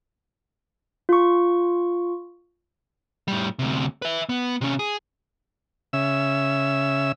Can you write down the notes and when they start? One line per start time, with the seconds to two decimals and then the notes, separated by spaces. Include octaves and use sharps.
1.09 F4 C#6
3.28 A2 G3
3.59 D2 C3
4.02 B4 E5
4.29 B3
4.61 C3 C#4
4.79 G#4
5.93 C#3 E5 E6